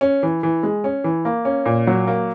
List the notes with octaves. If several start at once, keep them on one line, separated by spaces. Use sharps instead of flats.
C#4
E3
E3
G#3
C#4
E3
A#3
C#4
A#2
F#3
A#3